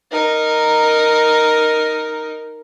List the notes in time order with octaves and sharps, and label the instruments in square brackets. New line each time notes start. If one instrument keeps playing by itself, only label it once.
[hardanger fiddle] D#4 A#4